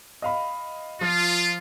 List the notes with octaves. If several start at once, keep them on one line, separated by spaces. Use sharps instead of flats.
D#5 F5 B5
F3 F4